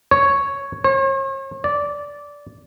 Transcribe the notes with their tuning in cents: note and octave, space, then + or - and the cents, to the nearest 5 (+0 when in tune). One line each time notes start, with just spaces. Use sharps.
C#5 +0
C#5 -45
D5 -15